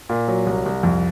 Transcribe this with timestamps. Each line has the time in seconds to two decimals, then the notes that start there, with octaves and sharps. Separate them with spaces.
0.09 A#2
0.28 F#3
0.46 C2
0.66 C2
0.83 F2